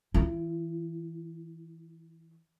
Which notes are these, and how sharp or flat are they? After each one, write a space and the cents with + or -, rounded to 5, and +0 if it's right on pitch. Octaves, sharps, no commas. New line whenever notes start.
E3 -15 E4 +30